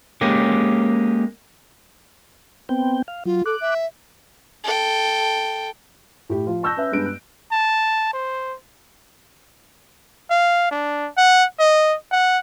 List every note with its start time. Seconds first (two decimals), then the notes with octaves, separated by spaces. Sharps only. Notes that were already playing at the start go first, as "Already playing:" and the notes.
0.21 G#3 A#3 C#4 G4
2.69 B3 C4 G5
3.08 F5
3.26 F#3 F4
3.46 A4 D6 F#6
3.61 E5
4.64 A4 G5
6.30 A2 G4
6.47 F3 F4
6.63 A5 C#6 E6 F#6 G6 A#6
6.76 C#4 B4 E5
6.92 G2 G#3 B3 D7
7.06 F#6
7.52 A5
8.13 C5
10.31 F5
10.71 D4
11.17 F#5
11.59 D#5
12.12 F#5